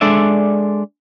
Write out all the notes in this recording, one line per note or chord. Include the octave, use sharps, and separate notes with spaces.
G#3 D4 A4 D5 E5